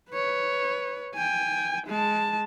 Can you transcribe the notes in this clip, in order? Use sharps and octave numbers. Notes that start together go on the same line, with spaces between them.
B4 C#5
G5 G#5
G#3 A5